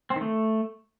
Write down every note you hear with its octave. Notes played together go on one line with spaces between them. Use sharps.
C4
D#3
A3